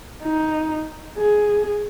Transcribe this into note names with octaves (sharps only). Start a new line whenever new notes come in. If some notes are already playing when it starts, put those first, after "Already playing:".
D#4
G#4